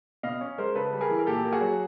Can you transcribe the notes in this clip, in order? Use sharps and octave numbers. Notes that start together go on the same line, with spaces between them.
B2 D#5 F5
C#4
G#3 A#4 C5
C#3 A4 B4
G3
G#4 A#4
E3
A#4
A#2 G4 A4
A#3
F#4 G#4
F#3